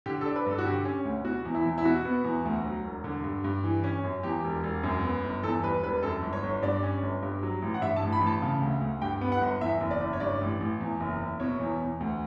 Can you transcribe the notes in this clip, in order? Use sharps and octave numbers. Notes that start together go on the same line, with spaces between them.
D3 G4
A4
D4
B4
G2 A4
F#4
D3 G4
C#4
D2
B2 F#4
E2
E4
E2
E4
B2 F#4
B3
E2
D2
F#3
E1
D3
G2
G2
E3
C#4
F#2
E2 G4
E1
E1
F#2
B3
G1
E2 A4
G3 B4
E1 B4
F#2 A4
G1
C#5
G1
G2 D5
C#4
G1
G2
F#3
A1
F#5
G2 E5
A5
A1
B5
A1
A5
C#3
D2
D2
G2 G5
B3
F#5
G1
E2 E5
F#1
D5
F#1
C#5
G2 D5
A1
A1
E2
F#1
F#1
B2 C#5
E2
E2
D2